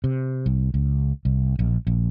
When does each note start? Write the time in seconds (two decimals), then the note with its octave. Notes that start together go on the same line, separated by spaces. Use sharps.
0.04 C3
0.46 C2
0.74 C#2
1.25 C2
1.59 A#1
1.87 A#1